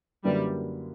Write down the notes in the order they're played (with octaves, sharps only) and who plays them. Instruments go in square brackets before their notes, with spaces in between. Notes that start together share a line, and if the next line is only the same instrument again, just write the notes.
[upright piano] F#2 D3 A#3 E4 B4 [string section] G3